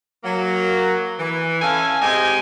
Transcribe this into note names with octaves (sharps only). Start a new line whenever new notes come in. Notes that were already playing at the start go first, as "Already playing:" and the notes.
F#3 A#3
E3
C#4 A4 E5 F5 G#5
C3 G#3 D#4 G4 D#5 G#5